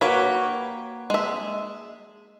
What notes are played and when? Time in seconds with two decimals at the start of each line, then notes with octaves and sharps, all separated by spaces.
0.01 A#3 F#4 G4 B4 C#5 B5
1.10 G#3 E5